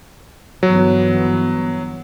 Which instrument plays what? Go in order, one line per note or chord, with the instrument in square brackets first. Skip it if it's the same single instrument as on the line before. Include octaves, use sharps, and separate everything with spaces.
[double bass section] G1 E3 B3 [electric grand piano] F#3